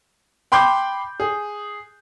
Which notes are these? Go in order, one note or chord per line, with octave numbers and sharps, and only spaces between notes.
G5 B5 C6 D6 G6
G#4